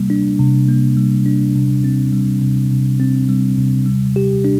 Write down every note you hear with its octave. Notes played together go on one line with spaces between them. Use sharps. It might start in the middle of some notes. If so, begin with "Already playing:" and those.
Already playing: C3 G3 A#3
D4
C3
A#3
G3
D4
C3
C4
G3
C3
C3
C4
G3
C3
G3
G4
D4